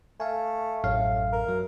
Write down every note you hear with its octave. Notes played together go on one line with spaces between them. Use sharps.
A3 F5 G#5
A1 F#2 A2 F5
A#4
F#3